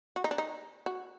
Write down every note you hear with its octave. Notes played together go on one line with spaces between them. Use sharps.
F#4
D#4
D4
D#4
F#4